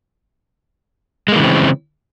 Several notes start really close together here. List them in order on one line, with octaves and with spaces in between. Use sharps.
G#3 A#3 E3 C#3 C4